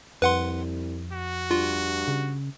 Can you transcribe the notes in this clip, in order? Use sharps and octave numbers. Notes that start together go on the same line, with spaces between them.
C2 F2 B4 F#5 C6
F#4
G2 F4
C#3